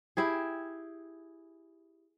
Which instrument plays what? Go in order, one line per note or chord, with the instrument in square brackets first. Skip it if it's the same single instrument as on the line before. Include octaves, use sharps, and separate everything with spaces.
[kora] E4 G4 G#4